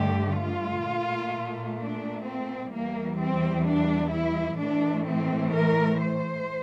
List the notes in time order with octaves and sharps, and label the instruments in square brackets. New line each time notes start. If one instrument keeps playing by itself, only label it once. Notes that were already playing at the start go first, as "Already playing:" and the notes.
Already playing: [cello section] G2 D3 A3 G4
F4
A#2 A3
D4
C4
E2 E3 G3 A#3
C4
D4
E4
A2 E3 A3 D4
C4
A#4
C5